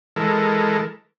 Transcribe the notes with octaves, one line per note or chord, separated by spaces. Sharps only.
E3 G#3 A4 A#4